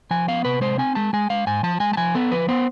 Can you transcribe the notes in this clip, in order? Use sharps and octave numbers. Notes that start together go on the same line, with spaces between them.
F3 G#5
B3 F5
C3 B4
G#3 C5
C4 G#5
G#3 A5
G#3 G#5
G#3 F5
G#2 G#5
F3 A5
G#3 G#5
A5
F3 G#5
B3 A4
F3 B4
B3 C5